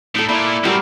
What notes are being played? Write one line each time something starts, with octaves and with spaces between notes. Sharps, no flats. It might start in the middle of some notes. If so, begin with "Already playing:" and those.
A2 D#4 A4
A#2 E4 D5
A2 F#3 G3 C4 A#4